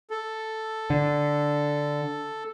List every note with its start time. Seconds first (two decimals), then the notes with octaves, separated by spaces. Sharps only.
0.10 A4
0.90 D3